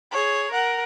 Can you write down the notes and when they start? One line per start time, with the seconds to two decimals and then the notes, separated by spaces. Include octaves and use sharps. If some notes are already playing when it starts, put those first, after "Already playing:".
0.11 G#4 C#5
0.51 A#4 F#5